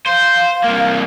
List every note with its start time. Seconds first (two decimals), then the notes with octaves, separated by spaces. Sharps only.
0.06 C5 F5
0.64 C2 A#3